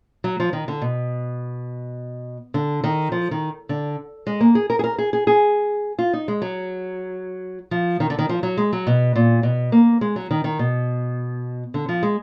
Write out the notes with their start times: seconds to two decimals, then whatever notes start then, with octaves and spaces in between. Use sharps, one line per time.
0.24 F#3
0.40 F3
0.53 D#3
0.68 D3
0.82 B2
2.54 D3
2.84 D#3
3.12 F3
3.31 D#3
3.69 D3
4.27 G#3
4.41 A#3
4.55 G#4
4.70 A#4
4.79 G#4
4.84 A#4
4.98 G#4
5.13 G#4
5.27 G#4
5.99 F4
6.13 D#4
6.28 G#3
6.42 F#3
7.71 F3
8.00 D#3
8.10 D3
8.19 D#3
8.29 F3
8.43 F#3
8.57 G#3
8.73 F#3
8.87 B2
9.16 A#2
9.43 B2
9.72 A#3
10.01 G#3
10.16 F#3
10.31 D#3
10.44 D#3
10.59 B2
11.74 D3
11.89 F3
12.03 G#3